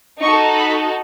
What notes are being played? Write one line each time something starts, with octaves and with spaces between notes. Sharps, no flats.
D#4 F#4 A4 C#6
B5